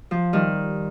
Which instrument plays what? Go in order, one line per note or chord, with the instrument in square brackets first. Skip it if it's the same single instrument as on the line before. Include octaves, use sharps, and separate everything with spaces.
[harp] F3
D#3 G3